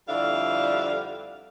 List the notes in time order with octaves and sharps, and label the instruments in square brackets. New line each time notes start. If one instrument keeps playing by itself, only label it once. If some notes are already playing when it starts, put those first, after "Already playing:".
[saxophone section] F2 D3 G3 E4 F5